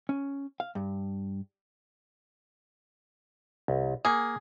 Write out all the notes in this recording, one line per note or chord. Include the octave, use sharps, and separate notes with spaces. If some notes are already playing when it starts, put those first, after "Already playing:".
C#4
F5
G2
C2
A#3 G#4 F#5